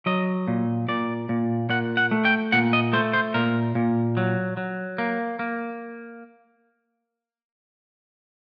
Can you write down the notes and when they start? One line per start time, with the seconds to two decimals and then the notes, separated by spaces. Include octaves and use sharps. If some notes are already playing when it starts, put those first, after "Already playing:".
0.06 F#3 D#5
0.48 A#2
0.88 A#2 D5
1.29 A#2
1.69 A#2 F#5
1.97 F#5
2.11 A3
2.25 G5
2.52 A#2 F#5
2.73 D#5
2.93 A3 C5
3.13 C5
3.34 A#2 A#4
3.75 A#2
4.17 F#3
4.57 F#3
4.98 A#3
5.39 A#3